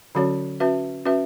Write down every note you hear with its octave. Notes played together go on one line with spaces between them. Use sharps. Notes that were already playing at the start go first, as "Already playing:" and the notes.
D3 F#3 C#4 F#4 C#5
C#4 F#4 B4 E5
C#4 F#4 B4 E5